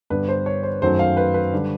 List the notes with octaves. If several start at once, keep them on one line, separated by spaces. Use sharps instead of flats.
G2 D3 G3 B3 B4
C5
C#5
C5
F#2 D#3 F#3 A3 C5
F5
B4
B4
D3 G3